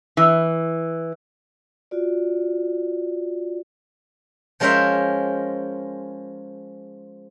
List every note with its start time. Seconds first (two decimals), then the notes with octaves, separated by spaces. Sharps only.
0.17 E3
1.91 F4 F#4 D5
4.60 F3 G#3 C#4 A#4 C5 E5